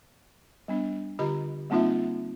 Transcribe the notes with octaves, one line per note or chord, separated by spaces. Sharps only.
G3 B3 D4
D3 F4 G4 D#5 A#5 B5
G3 A#3 C4 D#4 F4 E5